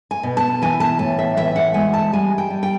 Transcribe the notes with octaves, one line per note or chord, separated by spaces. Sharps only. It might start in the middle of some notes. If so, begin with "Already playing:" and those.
G#5
B2
A5
E3 G#5
A5
A2 G#5
E5
E3 E5
F#5
G#3 G#5
A5
G3 G#5
G5
G3
G5